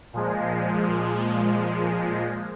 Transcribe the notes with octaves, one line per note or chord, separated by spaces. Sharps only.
A#2 F3 G#3